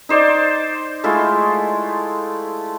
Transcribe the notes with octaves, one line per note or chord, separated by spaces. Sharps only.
D#4 C5 D5
G#3 A3 E4 F4